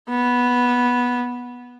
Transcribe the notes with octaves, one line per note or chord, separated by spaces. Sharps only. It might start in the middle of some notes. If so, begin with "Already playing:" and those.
B3